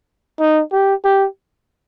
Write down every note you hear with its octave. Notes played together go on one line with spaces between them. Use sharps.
D#4
G4
G4